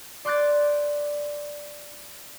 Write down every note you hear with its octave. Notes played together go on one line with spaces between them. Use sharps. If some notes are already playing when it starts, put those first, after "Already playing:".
D5 C6 D6 F#6 G6 A6